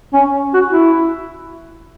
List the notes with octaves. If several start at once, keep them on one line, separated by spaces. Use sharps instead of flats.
C#4
F#4
E4